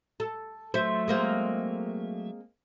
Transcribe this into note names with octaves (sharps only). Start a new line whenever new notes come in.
A4
F#3 A3 C5 E5
G#3 A#3 C4